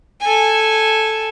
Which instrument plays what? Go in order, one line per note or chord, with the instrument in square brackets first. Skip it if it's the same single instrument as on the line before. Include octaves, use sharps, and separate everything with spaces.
[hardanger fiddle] A4 G#5